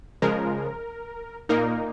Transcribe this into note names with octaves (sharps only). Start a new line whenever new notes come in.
C#3 F3 G#3 A#4
A#2 A#3 D#4 A#4